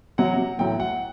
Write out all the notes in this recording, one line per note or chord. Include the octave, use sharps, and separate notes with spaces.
C3 F#3 F#5
A2 F#3 G5
F#5